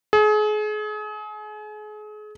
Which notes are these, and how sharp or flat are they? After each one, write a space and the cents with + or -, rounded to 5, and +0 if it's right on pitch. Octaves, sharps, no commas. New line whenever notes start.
G#4 +35